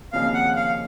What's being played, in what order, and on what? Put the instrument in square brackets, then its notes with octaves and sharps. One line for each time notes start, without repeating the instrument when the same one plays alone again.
[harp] D#2 C#3 F3 C4 D#4 [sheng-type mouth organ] F5
[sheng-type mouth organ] F#5
F5